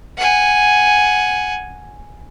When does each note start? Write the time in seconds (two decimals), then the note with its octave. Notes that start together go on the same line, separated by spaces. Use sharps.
0.17 F#5 G#5